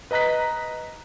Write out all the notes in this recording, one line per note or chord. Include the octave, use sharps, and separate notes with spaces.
B4 D#5 A#5 F#6 B6